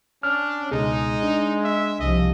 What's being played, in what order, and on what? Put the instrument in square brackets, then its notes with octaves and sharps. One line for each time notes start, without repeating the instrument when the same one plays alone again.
[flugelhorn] C#4 [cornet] D4 [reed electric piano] F6
[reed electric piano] C#2 B2 G#4 [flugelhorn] G#3 [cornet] D#4
[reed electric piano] D4
[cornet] E5
[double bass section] C2 F3 [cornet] D#5